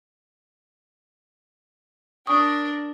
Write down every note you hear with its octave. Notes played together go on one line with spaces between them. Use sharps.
D4 A#4 C#6 D#6